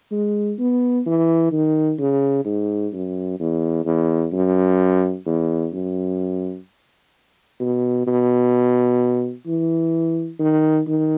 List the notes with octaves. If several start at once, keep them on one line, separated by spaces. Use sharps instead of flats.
G#3
B3
E3
D#3
C#3
G#2
F#2
E2
E2
F#2
E2
F#2
B2
B2
E3
D#3
D#3